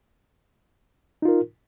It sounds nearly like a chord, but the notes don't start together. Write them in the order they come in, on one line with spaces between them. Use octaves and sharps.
D#4 F4 A#4